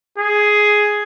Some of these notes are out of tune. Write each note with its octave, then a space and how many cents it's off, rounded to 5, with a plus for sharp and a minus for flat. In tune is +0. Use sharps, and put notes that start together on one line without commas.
G#4 +5